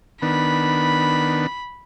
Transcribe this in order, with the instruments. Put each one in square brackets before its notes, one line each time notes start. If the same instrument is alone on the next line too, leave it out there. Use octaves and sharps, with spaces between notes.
[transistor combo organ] D#3 B3 D4 [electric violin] B5